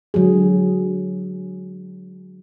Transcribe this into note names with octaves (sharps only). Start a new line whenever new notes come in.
D3 F#3 G#3 G#4